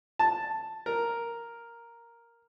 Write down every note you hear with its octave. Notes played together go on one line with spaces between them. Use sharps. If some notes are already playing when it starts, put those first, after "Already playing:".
A5
A#4